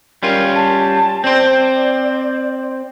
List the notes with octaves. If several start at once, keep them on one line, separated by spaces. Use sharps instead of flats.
G3 C#4 F4 A#4
A5
C4 C5 D5